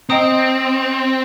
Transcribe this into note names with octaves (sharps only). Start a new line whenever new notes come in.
C4 D#5 G5 A#5 D#6